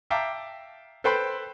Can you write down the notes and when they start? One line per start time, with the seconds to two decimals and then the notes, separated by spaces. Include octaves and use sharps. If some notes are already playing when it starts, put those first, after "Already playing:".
0.10 E5 F5 G5 A5 A#5 D6
1.04 A4 B4 C5 G5 B5 C6